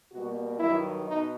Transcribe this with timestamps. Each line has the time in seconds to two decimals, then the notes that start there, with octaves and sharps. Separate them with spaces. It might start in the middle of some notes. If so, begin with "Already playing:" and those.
0.11 B2 G3 A#3 F#4
0.59 G2 D#3 F#3 E4
1.06 B2 D#4